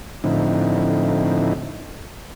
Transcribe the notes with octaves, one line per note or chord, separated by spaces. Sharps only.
A2 D3 F3 C4 D#4 E4